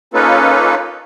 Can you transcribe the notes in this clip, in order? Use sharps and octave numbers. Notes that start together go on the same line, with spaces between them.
A#3 C#4 D#4 F4 A4 B4